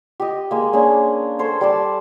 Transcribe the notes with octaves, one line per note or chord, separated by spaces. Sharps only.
G4 D#5
G#3 A#3
G#3 A#3 C#4 D4
A4 C5 C#5
G3 D5 A5